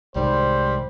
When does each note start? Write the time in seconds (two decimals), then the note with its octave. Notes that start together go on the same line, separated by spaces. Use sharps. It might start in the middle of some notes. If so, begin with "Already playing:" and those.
0.16 C2 G#2 D#3 G3 C5